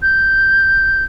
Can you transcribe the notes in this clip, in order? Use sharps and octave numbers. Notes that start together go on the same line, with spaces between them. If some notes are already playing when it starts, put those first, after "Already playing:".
G6